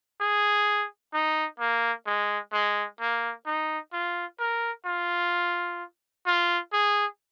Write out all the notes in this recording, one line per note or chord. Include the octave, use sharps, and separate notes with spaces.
G#4
D#4
A#3
G#3
G#3
A#3
D#4
F4
A#4
F4
F4
G#4